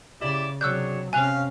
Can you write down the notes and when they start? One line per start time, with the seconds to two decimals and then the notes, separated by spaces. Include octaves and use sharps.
0.21 C#3 E4 G4 D5
0.61 C3 F#3 D4 G#4 C#5 E6 F#6 G6
1.13 C3 C#4 F5 G#5 F#6 F7